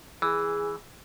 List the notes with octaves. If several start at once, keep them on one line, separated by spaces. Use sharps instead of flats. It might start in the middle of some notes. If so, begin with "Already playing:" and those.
E3 G#4